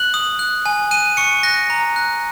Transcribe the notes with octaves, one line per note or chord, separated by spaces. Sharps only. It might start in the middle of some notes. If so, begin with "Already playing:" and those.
Already playing: F#6 F#7
D#6
F#6
G#5
F#6 D#7
C#6 C#7
F#6 A#6
A#5
F#6